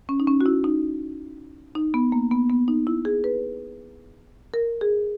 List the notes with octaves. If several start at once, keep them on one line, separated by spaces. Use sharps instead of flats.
C#4
D#4
C#4
F#4
E4
D#4
D#4
B3
A#3
B3
B3
D#4
E4
G#4
B4
A#4
G#4